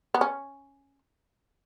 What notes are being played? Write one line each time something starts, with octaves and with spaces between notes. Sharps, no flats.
B3
C#4